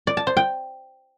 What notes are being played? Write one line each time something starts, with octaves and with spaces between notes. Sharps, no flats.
D5
A5
C5
G5